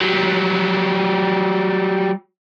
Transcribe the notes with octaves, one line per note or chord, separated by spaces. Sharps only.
F#3 G3